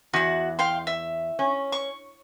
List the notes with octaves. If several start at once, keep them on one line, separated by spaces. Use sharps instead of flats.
E2 F#4 F#5
F5 G5 C6
E5
C#4
C#6